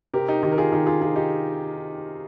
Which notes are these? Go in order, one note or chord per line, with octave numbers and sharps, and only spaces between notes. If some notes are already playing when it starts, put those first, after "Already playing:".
C3 G4 A#4
D#4 G4
D#3 D#4 G4
A#4
F4 G#4
D#3 D#4 G4
F4 G#4
C3 F4 G#4
D#4 G4